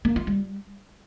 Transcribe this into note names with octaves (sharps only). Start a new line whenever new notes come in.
A#3
F4
G3